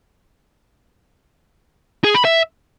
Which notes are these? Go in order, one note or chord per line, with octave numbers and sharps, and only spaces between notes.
G#4
B5
E5